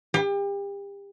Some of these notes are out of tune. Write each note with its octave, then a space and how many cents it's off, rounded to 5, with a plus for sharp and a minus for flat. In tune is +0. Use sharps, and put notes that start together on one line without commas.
G4 +35